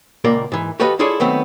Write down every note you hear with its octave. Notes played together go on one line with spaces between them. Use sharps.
C#2 A#2 A#3 A#4 D5
G#2 E3
F#4 G4 A4 B4 D#5 F5
E4 F4 G#4 A4 C#5 D5
D#3 F#3 A3 B3 C4